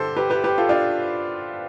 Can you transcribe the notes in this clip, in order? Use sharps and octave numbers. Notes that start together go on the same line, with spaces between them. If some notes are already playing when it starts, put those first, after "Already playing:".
Already playing: G2 D3 G4 A4 C5
G4 B4
G4 B4
G4 B4
F4 A4
D4 F4